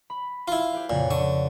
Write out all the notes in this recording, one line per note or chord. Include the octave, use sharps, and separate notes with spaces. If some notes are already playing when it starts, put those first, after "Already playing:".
B5
E4 F4
G4 B4 F5
F2 A#2 C#3 F#5
D3 C#6